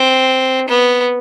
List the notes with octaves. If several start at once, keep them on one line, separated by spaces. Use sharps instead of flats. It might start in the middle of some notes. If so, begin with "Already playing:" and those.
Already playing: C4
B3